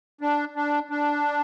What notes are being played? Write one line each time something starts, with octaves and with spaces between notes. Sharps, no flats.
D4
D4
D4